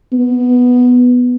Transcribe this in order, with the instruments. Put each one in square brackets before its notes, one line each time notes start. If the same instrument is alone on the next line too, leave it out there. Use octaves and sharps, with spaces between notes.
[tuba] B3